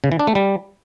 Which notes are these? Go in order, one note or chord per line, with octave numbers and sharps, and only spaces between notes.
C#3
E3
D4
A3
G3